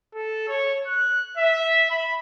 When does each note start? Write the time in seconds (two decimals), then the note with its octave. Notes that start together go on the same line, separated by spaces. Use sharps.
0.15 A4
0.49 C#5
0.87 F#6
1.37 E5
1.91 B5